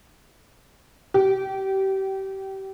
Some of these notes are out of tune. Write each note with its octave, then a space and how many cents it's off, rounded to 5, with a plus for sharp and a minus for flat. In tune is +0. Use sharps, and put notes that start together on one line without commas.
G4 -30